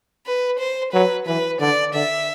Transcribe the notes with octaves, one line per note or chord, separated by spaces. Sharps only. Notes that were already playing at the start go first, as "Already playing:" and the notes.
B4
C5
F#3 B4
E3 B4
D3 D5
D3 E5